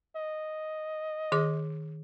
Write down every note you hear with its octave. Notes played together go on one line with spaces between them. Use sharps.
D#5
D#3 G#4 D6